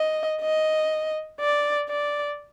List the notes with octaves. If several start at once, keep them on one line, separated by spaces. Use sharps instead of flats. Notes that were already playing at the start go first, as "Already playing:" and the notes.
Already playing: D#5
D#5
D5
D5